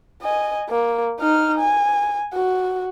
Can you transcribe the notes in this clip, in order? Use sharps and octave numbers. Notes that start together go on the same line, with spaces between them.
D#5 G#5
A#3
D#4 F6
G#5
F#4